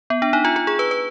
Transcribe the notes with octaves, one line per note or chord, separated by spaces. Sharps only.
B3
D4
D#4
F4
F4
G#4
B4
B4